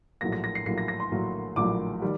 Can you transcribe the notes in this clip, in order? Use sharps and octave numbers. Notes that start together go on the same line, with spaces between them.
A#1 A2 F#3 A#3 A#6
A#6
A#6
C7
A#1 A2 F#3 A#3 C7
A#6
A#6
C6
A#1 A2 F#3 A#3
A#1 A2 F#3 A#3 D6
D#3 G3